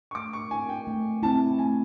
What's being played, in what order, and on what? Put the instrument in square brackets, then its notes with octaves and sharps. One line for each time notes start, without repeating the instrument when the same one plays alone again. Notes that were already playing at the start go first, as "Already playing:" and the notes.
[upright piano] C#6
[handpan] A3 [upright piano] D6
[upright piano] C#6
[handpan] C4 E4 [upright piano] G#5
[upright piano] G5
[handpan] A3
[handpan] C4 E4 [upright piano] A5
[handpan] A3 [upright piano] G#5